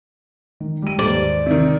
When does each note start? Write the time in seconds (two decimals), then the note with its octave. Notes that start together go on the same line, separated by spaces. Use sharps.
0.60 D#3
0.82 G3 D#7
0.99 D#2 G#2 C5 D5
1.46 C3 D#3